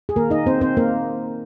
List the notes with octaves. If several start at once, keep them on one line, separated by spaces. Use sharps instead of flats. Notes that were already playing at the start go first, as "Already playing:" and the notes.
G#4
D#3 A#3 A#4
D#4 D#5
A#3 C4 C5
C4 C5
A#3 A#4